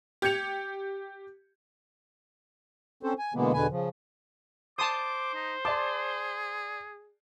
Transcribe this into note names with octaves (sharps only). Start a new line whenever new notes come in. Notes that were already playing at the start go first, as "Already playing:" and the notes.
G4 G6 G#6 C#7 F7
C4 C#4 A4 C5
G#5
B2 D3 E3 G#3 A#3 B3
E2 B2 D3 B4 G#5
C#3 F3
C5 A5 C6 D6 D#6
D#4
G#4 D5 A5 C6 D6